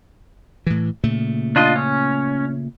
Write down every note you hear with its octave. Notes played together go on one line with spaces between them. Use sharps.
A2 E3
A#2 C#3 A3
D4 F4 D#5
C#4